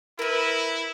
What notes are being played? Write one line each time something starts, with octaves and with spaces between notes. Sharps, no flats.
E4 A#4 B4